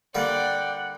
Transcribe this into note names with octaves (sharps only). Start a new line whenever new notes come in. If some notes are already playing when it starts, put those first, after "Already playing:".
D3 G3 A#3 D5 F#5 G5